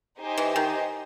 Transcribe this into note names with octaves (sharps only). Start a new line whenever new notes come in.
D#4 G4 C5 D#5 G#5
E3
D#3